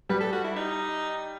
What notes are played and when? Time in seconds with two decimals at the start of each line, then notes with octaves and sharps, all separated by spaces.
0.09 G3 B4
0.20 A4
0.33 F#4
0.44 E4
0.56 D#4